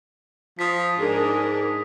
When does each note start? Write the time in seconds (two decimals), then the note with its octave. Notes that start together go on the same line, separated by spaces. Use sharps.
0.59 F3 D#6 B6
0.98 G#2 D4 G#4 A#4